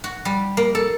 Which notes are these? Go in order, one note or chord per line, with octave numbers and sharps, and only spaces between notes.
F#4
G3
A#3
A4